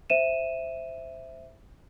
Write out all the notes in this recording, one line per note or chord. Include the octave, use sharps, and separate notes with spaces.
C5 E5 D#7 E7